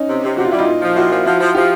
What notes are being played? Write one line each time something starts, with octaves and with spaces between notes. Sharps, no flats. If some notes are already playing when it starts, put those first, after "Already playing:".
Already playing: C#4 D#4
C3
C3
C3 F#4
F4
G3 E4
D#4 F4
A#2
F3
A#2 E4 F#4
F3
F3 E4 F#4
F3
F3 F4 G4